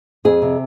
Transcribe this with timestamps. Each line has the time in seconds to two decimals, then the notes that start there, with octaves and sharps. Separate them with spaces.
0.25 F2 G#4
0.42 C3